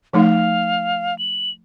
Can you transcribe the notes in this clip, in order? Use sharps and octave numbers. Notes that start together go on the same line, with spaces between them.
F3 A3 D#4 F5
F#7